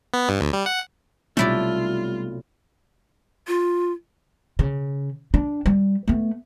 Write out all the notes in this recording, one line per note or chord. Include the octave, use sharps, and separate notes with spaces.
B3
G2
D2
G3
F#5
B1 C3 G3 A3 E4 F4 D5
F4
C#3
D4
G3
A3 B3